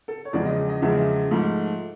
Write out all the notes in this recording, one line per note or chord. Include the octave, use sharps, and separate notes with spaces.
A4
C#5
E2 C#3 F3 G#3 D5
D#5
D#5
E2 C#3 F3 G#3 E5
G#2 F3 A3